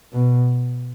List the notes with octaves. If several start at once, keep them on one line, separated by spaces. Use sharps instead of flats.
B2